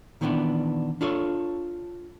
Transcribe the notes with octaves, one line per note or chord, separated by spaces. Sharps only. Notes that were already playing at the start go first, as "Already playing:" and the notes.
A#2 D#3 E3 B3 C#4 D4
D4 F4 A4 C#5